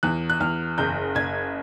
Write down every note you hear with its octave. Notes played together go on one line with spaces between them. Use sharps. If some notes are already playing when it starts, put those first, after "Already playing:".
E2 F#6
F#6
E2 F6
F#1 G6
F#1 G#6